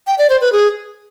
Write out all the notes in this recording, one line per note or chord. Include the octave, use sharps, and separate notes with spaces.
G5
D5
C5
B4
G#4